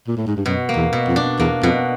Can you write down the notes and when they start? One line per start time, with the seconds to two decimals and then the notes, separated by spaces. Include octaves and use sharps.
0.08 A#2
0.17 A2
0.27 G#2
0.36 G2
0.46 F#2 B2
0.69 A#3
0.76 E2
0.93 B2
1.08 F2
1.16 D4
1.39 E2 A#3
1.63 F2 B2